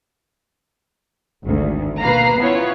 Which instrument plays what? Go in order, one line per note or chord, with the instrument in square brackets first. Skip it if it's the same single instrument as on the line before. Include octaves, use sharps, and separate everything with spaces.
[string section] G#1 D2
B2 A#3 B4 F5 A#5 C7
B3 C#4 E4 F4 C#5